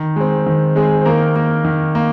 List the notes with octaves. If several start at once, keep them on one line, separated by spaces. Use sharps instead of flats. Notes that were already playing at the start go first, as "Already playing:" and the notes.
Already playing: D#3
G#3 C4
D#3
G#3 C4 G#4
C5
D#3 A#3 A#4
A#3
D#3
A#3